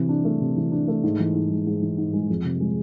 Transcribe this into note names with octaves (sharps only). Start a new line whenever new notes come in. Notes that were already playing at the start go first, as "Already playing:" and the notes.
Already playing: C3 E3
D4
A3
C3
E3
D4
A3
G#2
E3
G#2
G#3
G#2
E3
G#2
G#3
F2
C3
G#3